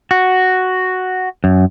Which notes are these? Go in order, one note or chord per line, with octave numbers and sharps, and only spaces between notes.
F#4
F#2